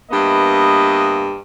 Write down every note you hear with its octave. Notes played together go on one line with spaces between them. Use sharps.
G2 A#3 B3 D#5 E5